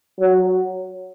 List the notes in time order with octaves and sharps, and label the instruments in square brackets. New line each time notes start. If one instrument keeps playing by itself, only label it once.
[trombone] F#3